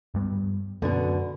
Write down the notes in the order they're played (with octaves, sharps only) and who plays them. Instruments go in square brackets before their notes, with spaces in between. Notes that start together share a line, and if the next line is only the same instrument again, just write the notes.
[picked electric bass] G2 G3 B3
[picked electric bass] F#2 B3 C#4 [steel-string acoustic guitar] B2 D3